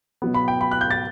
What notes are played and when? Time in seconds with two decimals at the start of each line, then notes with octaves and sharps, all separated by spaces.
0.22 B2 F#3 B3
0.34 B5
0.48 G5
0.61 B5
0.71 F#6
0.81 G6
0.91 A6